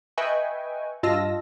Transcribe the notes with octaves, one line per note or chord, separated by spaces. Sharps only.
B4 D#5 E5 G5 G#5 C#6
G2 F4 D#5 A5 E6 A#6